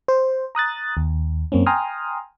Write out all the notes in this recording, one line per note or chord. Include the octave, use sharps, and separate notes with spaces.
C5
A#5 D#6 F#6 A6
D#2
F#2 A#3 C4 C#4
G5 G#5 A#5 C6 D#6 F6